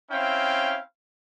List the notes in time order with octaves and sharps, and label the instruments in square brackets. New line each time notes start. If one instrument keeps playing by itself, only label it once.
[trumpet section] C4 C#4 E4 F5 G5